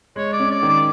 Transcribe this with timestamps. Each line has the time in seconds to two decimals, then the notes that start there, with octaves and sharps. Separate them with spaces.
0.16 G#3 C#5
0.33 D5
0.40 C#4
0.51 D5
0.63 D#3
0.69 D5